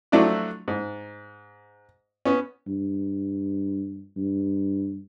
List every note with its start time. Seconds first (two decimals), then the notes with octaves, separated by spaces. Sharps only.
0.12 F3 F#3 A3 D4 E4 F#4
0.68 G#2
2.25 B3 C#4
2.67 G2
4.17 G2